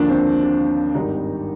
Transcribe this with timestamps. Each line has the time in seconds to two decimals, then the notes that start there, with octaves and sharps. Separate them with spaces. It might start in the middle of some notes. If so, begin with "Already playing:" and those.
Already playing: D#2 D3 F3 D4
0.09 C4
0.43 D4
0.95 G#1 G2 D#3 G3 D#4